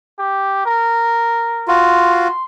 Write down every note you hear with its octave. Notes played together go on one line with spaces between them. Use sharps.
G4
A#4
F4 F#4
C6